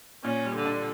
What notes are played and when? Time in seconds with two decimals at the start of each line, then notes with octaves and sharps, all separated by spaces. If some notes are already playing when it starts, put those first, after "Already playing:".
0.24 A#2 C#4
0.45 G3
0.56 D3
0.65 D4